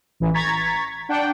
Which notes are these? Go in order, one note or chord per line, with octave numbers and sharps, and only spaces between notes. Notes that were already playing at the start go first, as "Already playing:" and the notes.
A1 E3
A#5 C#6 G#6 A6 B6
D4 F#5 G5